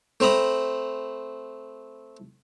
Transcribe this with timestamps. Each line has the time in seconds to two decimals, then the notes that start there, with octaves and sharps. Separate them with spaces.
0.20 A3 C4 A#5 B5 D#6